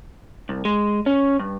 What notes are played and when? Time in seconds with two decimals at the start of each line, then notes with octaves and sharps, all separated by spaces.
0.49 C2
0.65 G#3
1.06 C#4
1.39 G2